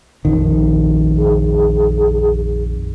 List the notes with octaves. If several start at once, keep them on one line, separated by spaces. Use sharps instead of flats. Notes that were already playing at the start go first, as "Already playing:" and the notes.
A#1 F2 D#3
G#4